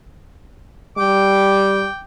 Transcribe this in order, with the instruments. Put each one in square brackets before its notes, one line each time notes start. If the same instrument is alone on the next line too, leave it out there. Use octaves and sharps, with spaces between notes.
[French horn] G3 [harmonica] G5 D6